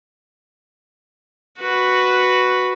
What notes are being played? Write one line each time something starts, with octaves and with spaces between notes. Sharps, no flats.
F#4 B4